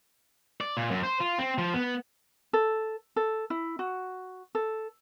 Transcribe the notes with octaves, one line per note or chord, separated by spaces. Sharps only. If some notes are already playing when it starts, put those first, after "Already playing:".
D5
A#2
F#2
C5
F4
C4
F3
B3
A4
A4
E4
F#4
A4